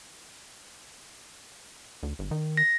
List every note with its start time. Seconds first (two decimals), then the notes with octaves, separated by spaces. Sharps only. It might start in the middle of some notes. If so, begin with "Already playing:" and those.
2.03 D2
2.19 G1
2.31 D#3
2.57 A#6